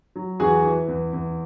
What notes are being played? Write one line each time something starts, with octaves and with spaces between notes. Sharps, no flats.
F#3
E2 F#4 G#4
E3
E2
E2